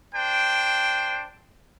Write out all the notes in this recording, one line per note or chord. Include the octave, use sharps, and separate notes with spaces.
D4 C5 G5